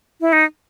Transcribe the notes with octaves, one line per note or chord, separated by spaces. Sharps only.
E4
D#4